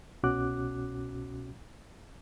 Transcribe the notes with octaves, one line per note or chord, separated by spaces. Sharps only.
C2 B2 C#4 F#4 D6 F#6